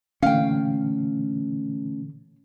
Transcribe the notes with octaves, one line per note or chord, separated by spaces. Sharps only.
A#2 D3 E3 A3 C#4 F5 G5